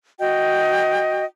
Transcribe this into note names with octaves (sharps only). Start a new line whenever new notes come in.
F#4 D#5 G5